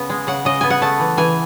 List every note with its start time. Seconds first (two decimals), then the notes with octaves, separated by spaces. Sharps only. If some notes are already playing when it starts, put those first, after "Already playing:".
Already playing: C#3 B3
0.10 G#3
0.27 C#3 F#5
0.45 C#3 D#5
0.61 B3 G#5
0.70 F#5
0.82 A3 A5
1.00 E3
1.17 E3 G#5